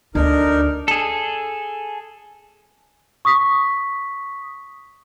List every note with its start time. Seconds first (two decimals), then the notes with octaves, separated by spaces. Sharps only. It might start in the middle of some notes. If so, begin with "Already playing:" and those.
0.15 D2 D4 D#4 A#4
0.88 G#4 A4
3.25 C#6 D#6 B6